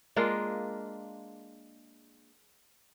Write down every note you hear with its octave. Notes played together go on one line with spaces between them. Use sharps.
G#3 A#3 D4 F4